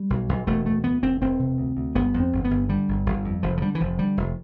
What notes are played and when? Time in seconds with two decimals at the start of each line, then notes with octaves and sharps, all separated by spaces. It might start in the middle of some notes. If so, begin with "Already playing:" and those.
Already playing: G3
0.10 B1
0.29 B1
0.47 E1 A3
0.65 D2 A3
0.84 D2 B3
1.03 E1 C4
1.21 E1 C4
1.39 C3
1.58 D2
1.77 D2
1.95 G1 B3
2.14 F2
2.20 C4
2.32 G1
2.45 B3
2.51 G1
2.69 D3 G3
2.88 G1
3.06 G1
3.25 F2
3.43 F1 F3
3.57 F3
3.62 D3 G3
3.75 E3
3.80 F1 F3
3.99 D3 G3
4.17 F1